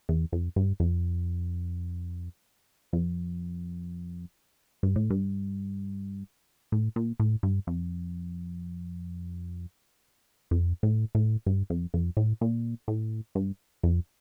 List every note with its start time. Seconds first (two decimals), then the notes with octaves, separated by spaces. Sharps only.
0.09 E2
0.32 F2
0.56 G2
0.80 F2
2.93 F2
4.83 G2
4.96 A2
5.10 G2
6.72 A2
6.96 A#2
7.20 A2
7.43 G2
7.67 F2
10.51 F2
10.83 A2
11.15 A2
11.46 G2
11.70 F2
11.94 F2
12.17 A2
12.41 A#2
12.88 A2
13.35 G2
13.83 F2